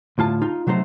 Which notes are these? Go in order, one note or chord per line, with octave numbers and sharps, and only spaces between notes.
D2 A2 F4 A5
D#4 F4
C3 F#3 A3 D#4 C5